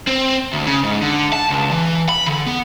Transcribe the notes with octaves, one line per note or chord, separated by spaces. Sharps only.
C4
D2
C#3
G#2
D3
A5
C#2
E3
B5
D3
B3